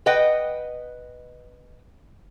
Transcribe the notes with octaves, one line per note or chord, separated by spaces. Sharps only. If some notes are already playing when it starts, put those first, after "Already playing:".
B4 D#5 F#5 G5